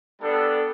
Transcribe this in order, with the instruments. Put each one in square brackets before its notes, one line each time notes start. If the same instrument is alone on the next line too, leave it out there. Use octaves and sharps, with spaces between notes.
[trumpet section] G3 B3 D4 A4